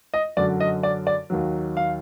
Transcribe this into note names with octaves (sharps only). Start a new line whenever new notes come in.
D#5
F#2 D3 F#3 D5
D#5
D5
D5
D#2 D#3 F#3
F5